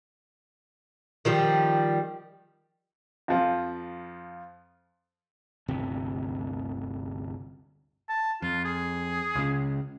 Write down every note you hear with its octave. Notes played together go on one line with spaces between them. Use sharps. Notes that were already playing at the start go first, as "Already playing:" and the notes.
D#3 F3 G3
F2 F3
G1 D2 C3
A5
F2 F4
G#4
C#2 C#3